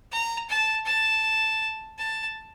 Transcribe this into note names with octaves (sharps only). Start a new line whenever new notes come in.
A#5
A5
A5
A5